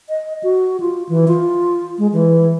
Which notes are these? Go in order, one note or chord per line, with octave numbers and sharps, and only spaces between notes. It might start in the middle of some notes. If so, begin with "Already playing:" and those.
D#5
F#4
F4
E3
F4
G#3
E3